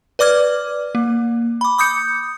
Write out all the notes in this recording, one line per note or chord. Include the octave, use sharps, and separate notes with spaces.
B4 D5 D6 F6 G#6
A#3
B5 D6
D6 D#6 G6 C#7